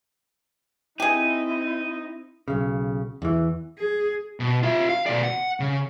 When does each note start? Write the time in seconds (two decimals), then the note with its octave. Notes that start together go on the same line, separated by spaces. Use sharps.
1.00 C4 D#4 E4 G4 G#4
2.48 B1 C#3
3.22 E2 E3
3.78 G#4
4.40 B2
4.63 F4 E5
4.89 F5
5.06 B2 D5
5.23 F#5
5.60 C#3